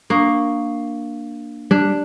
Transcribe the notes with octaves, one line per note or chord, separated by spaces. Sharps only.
A#3 D4 C#6 D#6
G3 D4